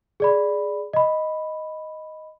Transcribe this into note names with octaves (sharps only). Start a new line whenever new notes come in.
G#4 D5 B5
D#5 B5